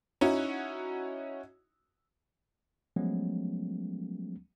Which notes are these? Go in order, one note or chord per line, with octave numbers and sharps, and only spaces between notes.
C#4 D#4 E4 F#4
F3 F#3 G#3 A3 B3 C#4